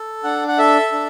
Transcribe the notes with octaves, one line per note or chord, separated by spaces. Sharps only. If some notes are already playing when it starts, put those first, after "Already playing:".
Already playing: A4
D4 F#5
F#5
A4 E5
D4